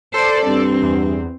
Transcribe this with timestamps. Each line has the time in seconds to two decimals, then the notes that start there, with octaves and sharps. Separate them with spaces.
0.14 A4 C5 D5
0.46 G2 C4
0.82 E2